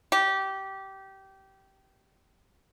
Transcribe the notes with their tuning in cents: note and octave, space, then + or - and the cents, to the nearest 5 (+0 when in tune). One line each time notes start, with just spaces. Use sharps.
G4 -20